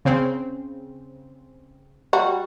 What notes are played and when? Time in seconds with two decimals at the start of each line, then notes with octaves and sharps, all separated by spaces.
0.05 C#3 C4
2.13 G3 F#4